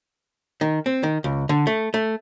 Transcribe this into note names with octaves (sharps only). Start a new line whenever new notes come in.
D#3
C4
D#3
C#2
D3
A3
A3